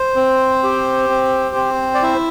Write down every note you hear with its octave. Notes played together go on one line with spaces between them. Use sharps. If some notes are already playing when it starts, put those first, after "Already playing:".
Already playing: C5
C4
G4
C4
C4
D5
E4 E5